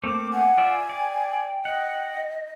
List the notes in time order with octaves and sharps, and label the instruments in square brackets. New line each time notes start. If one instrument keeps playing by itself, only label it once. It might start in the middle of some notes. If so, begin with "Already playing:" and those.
[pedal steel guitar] A3 A#3 C4 [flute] D6
[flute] F#5 [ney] G#5
[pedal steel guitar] F4 D5 E5
[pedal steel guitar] D5 [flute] G5
[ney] D#5 [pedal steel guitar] F#5